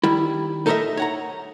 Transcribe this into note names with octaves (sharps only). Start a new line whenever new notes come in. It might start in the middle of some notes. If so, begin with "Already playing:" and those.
D#3 G3 E4
D#4 A4 A#4 C5 D#5 E5
C#5 F#5 A#5